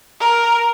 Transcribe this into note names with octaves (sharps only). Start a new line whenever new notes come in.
A#4